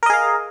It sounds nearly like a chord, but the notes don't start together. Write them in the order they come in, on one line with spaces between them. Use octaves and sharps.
A#4 D#5 G#4 F5